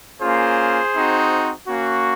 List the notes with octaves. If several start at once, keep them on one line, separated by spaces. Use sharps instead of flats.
A#3 C#4 F4 G#4 C5
C4 D#4 F#4
A#3 C#4 F#4